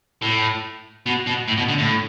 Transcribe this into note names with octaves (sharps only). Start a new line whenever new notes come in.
A2
B2
B2
A2
B2
D3
A2